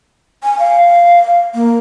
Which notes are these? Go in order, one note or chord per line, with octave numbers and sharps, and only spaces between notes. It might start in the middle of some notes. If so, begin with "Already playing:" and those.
G#5
F5
A#3